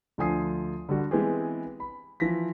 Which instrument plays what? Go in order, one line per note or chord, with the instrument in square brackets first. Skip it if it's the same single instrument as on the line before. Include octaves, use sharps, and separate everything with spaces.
[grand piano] D2 D3 F3 G#5 D#6 C7
D3 G3 F#4
E3 G#3 B3 C4 G4 G#4
B5
E3 F3 A#6 B6